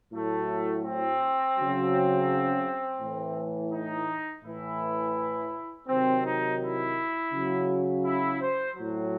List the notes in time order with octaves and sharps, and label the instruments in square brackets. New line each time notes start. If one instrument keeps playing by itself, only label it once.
[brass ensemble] A2 F#3 A3
C4
C#3 F#3
A2 E3
D#4
A2 E3 E4
C3 D#3 F#3 C4
D#4
E4
C#3 F#3
E4
C5
A2 F#3